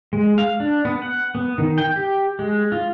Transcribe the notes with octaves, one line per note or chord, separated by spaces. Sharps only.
G#3
F5
D4
B3
F#5
B3
D#3
G5
G4
G#3
F4